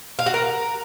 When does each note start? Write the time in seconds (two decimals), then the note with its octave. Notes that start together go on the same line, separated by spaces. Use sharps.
0.19 F5
0.26 F#4
0.34 A#4